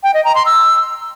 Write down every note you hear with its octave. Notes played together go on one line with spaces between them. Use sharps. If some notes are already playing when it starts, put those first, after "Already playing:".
G5
D#5
A#5
C6
E6